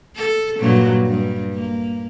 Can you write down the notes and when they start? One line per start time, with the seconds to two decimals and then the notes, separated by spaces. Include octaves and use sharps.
0.16 A4
0.60 G2 A#2 F#3
1.06 G2
1.55 A#3